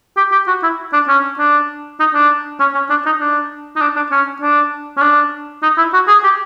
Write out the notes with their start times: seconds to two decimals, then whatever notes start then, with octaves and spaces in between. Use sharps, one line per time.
0.17 G4
0.32 G4
0.48 F#4
0.63 E4
0.93 D4
1.08 C#4
1.39 D4
2.00 D#4
2.15 D4
2.60 C#4
2.75 C#4
2.90 D4
3.06 D#4
3.20 D4
3.76 D#4
3.81 D4
3.96 D4
4.11 C#4
4.42 D4
4.97 C#4
5.02 D4
5.63 D#4
5.78 E4
5.93 F#4
6.08 G#4
6.24 G4